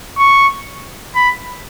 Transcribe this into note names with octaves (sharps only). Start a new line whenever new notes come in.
C#6
B5